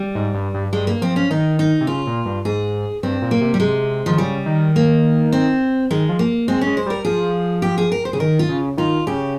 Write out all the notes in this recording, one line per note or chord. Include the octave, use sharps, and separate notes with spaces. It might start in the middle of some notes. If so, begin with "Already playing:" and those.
Already playing: G3
G#2
G2
G2
G2 G#3
A#3
F3 C4
C#4
D#3 D#4
D#4
C3
C#3 F4
A#2
G2
G#2 G#4
G2 C4
A#2
A#3
C3
G3
C3 G#3
D#3 F3
C#3 G3
D#3
A#3
C4
D#3 G#3
F3
A#3
G#3 C4
C#4
G#3
C5
G3 A#4
F3 G#4
G4
G#4
A#4
C5
C#3 G#4
D#3 A#4
F4
C#3
D#3 F4
C#3 G4